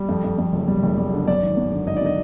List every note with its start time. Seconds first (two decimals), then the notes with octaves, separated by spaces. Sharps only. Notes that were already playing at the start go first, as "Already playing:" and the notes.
Already playing: G3
0.09 F2
0.24 F2
0.38 F2
0.53 F#1
0.68 G3
0.83 F#1
0.98 G3
1.13 D3
1.28 F#2 D5
1.42 G#1
1.57 F#2
1.72 D3
1.87 G#1 D#5
1.97 D5
2.02 D3 D#5